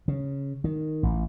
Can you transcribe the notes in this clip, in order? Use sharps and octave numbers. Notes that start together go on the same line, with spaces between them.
C#3
D#3
A1